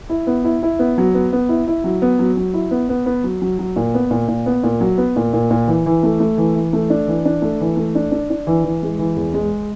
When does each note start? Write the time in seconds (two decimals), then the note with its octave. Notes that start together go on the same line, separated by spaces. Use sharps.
0.10 E4
0.27 B3
0.44 E4
0.63 E4
0.79 B3
0.98 F#3
1.14 B3
1.33 B3
1.49 E4
1.67 E4
1.84 F#3
2.02 B3
2.19 F#3
2.37 F#3
2.54 E4
2.71 B3
2.89 B3
3.06 B3
3.24 F#3
3.42 F#3
3.59 F#3
3.76 A#2
3.94 B3
4.11 A#2
4.28 A#2
4.46 B3
4.63 A#2
4.81 F#3
4.98 B3
5.16 A#2
5.33 A#2
5.51 A#2
5.68 E3
5.86 E3
6.03 A3
6.20 A3
6.38 E3
6.55 E3
6.73 A3
6.90 D4
7.07 E3
7.25 D4
7.42 A3
7.60 E3
7.77 A3
7.95 D4
8.12 D4
8.30 D4
8.47 E3
8.64 E3
8.83 G#3
8.99 E3
9.16 E2
9.34 G#3